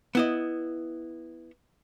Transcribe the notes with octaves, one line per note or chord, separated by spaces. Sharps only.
B3 E4 D#5